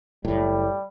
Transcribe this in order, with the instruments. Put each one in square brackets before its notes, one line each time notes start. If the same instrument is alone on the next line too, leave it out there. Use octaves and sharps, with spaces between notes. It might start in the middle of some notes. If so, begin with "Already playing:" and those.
[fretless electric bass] F#1 A2 [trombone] G3